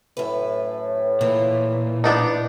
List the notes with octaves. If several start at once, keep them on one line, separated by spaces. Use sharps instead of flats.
F#2 A2 B4
A#2 E3
B3 D4 D#4